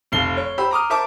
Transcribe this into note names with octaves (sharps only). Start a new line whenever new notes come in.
F1 F2 C7 G7
C#5
G4 C5 B5 E6
A#5 D6 D#6 F6
A#4 C5 E5 A5 D6